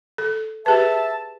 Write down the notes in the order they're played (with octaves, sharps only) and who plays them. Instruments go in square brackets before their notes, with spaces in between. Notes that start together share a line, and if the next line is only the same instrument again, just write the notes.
[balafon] A4
[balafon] G4 G#4 B4 [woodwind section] E5 A5